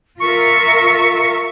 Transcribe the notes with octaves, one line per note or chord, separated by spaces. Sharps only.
F4 A#4 E5 C#6